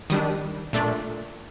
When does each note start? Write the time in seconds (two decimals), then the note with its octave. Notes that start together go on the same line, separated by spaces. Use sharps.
0.10 D#3 G3 D4 D#6
0.73 A#2 A3 D4